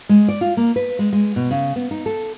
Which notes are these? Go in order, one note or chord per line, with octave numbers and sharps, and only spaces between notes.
G#3
D5
F4
A#3
B4
G#3
G#3
B2
C#3
B3
D#4
A4